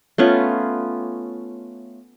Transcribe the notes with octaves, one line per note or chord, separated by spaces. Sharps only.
A3 B3 C#4 F4